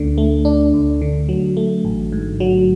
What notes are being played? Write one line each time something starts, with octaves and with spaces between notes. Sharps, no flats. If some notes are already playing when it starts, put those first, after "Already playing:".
Already playing: D2 D3 A3 D4
A3
D4
D2
D3
F#3
A3
A1
G#2
F#3